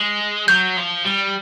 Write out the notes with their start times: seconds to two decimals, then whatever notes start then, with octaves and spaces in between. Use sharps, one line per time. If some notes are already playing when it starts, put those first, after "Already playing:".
Already playing: G#3
0.48 F#3 G6
0.77 F3
1.05 G3